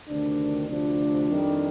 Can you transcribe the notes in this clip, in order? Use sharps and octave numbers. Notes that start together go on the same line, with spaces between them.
D2 C3 D#3 D4
D2 C3 F3 D4
F2 D#3 G3